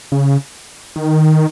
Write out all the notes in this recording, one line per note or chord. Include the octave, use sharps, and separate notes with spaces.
C#3
D#3